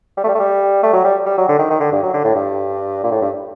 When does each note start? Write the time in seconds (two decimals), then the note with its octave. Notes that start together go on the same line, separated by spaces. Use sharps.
0.17 G3
0.24 A3
0.29 G3
0.35 A3
0.39 G3
0.83 A3
0.93 F#3
1.04 G3
1.26 G3
1.38 F#3
1.48 D3
1.59 D#3
1.70 D#3
1.80 D3
1.92 G2
2.03 F#3
2.14 D3
2.24 A2
2.35 G2
3.03 A#2
3.11 A2
3.21 G2